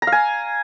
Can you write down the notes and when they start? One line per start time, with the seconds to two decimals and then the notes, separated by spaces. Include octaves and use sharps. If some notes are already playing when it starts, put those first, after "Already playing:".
0.02 A#5
0.07 F5
0.12 G#5